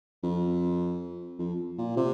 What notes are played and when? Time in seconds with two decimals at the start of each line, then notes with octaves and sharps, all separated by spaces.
0.23 F2
1.39 F2
1.78 A#2
1.97 C3